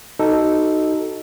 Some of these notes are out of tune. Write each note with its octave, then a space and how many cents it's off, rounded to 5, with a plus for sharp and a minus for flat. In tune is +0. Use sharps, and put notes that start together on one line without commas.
D#4 +0 F#4 +25 A4 +0